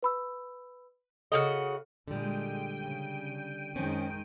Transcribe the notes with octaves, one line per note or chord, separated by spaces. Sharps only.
B4 B5 E6
C#3 F#4 A4 D#5 F6
A#2 D3 G3 G#3 G5 D7 D#7
C#3
F#2 D#3 G#3 C4 C#4